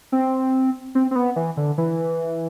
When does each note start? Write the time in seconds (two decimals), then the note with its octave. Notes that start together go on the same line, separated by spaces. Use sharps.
0.12 C4
0.95 C4
1.11 C4
1.16 B3
1.36 E3
1.57 D3
1.78 E3